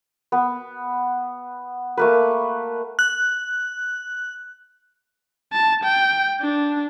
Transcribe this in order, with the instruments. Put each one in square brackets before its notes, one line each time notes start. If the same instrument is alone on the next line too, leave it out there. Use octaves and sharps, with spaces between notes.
[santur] B3
A3 A#3 B4
[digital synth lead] F#6
[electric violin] A5
G5
D4